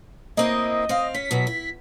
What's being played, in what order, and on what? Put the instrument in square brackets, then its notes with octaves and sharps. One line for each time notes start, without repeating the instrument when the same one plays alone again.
[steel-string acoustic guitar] A#3 C4 E4 [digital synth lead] D#5
[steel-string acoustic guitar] C4 F5
[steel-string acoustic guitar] C#4 [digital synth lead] B6
[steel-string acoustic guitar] B2 F#3 E4
E4